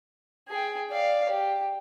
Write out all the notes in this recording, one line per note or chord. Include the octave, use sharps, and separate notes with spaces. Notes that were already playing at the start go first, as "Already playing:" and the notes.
G#4 G5
D5 F5
G4